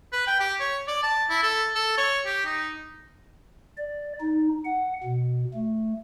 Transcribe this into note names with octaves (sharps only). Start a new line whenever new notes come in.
B4
G5
G4
C#5
D5
A5
E4
A4
A4
C#5
G4
D#4
D5
D#4
F#5
B2
A3